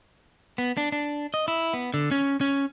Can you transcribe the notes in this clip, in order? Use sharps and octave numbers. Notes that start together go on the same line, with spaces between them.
B3
D4
D4
D#5
E4
B3
D3
C#4
C#4